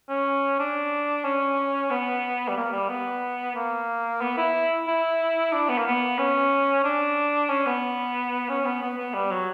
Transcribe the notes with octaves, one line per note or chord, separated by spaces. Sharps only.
C#4
D4
C#4
B3
G3
A#3
G3
B3
A#3
B3
E4
E4
D4
B3
A#3
B3
C#4
D4
C#4
B3
C#4
B3
B3
B3
G3
F#3